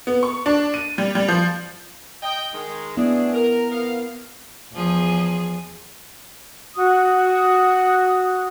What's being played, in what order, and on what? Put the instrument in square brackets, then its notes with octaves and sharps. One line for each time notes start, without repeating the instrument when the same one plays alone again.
[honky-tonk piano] B3
C#6
D4
D#7
G3
G3
F3
[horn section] D#5 G5
D#3 G#3
[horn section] A3 D4 G#4 [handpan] B3 E4
[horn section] A#4
B3 A#4 F5
[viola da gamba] E2 F3 G#4
[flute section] F#4 D#6